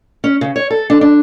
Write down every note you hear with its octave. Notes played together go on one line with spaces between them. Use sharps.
C#4
C#3
C#5
A4
D4
D4